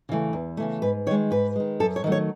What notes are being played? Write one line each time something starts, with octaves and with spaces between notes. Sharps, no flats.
C#3 E3 A3
E2
C#3 E3 A3
G#2 B4
D#3 G#3 C#5
G#2 B4
D#3 G#3
F#2 A4
C#5
D#3 F#3 A3
C#5